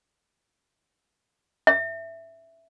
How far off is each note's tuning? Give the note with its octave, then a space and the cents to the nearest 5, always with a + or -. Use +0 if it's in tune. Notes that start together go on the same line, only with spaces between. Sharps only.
E5 +5